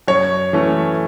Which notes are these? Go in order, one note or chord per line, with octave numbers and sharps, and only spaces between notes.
F#2 C#5
E3 A3 C#4